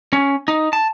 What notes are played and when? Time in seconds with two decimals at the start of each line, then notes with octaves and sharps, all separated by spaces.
0.13 C#4
0.48 D#4
0.73 A5